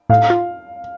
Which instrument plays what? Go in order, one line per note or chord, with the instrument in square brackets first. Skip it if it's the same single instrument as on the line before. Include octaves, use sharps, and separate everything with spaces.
[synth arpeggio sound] A2 [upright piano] F5
[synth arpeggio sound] F4